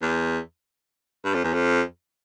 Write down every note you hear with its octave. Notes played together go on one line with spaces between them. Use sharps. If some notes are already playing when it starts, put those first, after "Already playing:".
E2
G2
F2
E2
F2